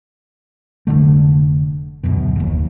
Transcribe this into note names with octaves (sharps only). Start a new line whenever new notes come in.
F1 C#2 D3 A3
D1 F#2 B2
F1 D#2